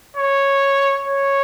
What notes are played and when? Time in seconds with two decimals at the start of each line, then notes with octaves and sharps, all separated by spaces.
0.17 C#5
1.07 C#5